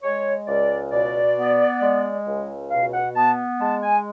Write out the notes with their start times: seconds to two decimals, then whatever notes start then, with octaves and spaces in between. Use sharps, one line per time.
0.03 G#3 C#5
0.47 C#2 D5
0.92 B2 D5
1.37 B3
1.81 G#3
2.26 C#2
2.71 B2 F5
2.93 F#5
3.15 B3 A5
3.60 G#3 A5
3.82 G#5